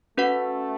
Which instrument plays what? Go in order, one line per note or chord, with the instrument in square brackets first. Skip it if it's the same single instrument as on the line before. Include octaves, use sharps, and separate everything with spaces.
[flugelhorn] A3 [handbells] C#4 F#4 B4 F#5